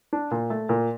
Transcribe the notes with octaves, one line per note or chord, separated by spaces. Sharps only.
D4
A#2
A3
A#2